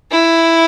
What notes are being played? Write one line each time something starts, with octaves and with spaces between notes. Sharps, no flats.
E4